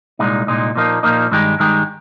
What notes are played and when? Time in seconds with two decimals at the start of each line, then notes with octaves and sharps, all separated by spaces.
0.19 C2 A#2 G#3 D#4
0.47 C2 A#2 G#3 D#4
0.76 A#2 F3 A#3 D#4
1.03 A#2 F3 A#3 D#4
1.31 G2 D#3 G#3 D#4 G4
1.60 G2 D#3 G#3 D#4 G4